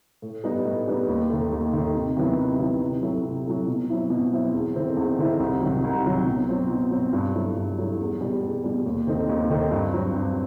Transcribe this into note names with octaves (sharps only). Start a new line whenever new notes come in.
A2
G3 B3 D#4
A2
G3 B3 D#4
D#2
D#3 A3
D#2
D#3 A3
C3
D#3 F#3 B3 E4
C3
D#3 F#3 B3 E4
C3
F#3 A3 E4
C3
F#3 A3 E4
B2
F#3 C4 E4
B2
F#3 C4 E4
E2
D#3 A3 C4 E4
E2
D#3 A3 C4 E4
C2
C3 D#3 F#3
C2
C3 D#3 F#3
B2
F#3 C4
B2
F#3 C4
G2
F#3 A3 E4
G2
F#3 A3 E4
E2
B2 G3
E2
B2 G3
D#2
D#3 A3 C4 D#4
D#2
D#3 A3 C4 D#4
G2
F#3 C4
G2